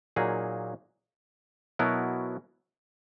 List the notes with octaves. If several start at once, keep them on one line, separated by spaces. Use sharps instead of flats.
A#2 F#3 A#3 D#4 G#4
B2 F#3 B3 E4 A#4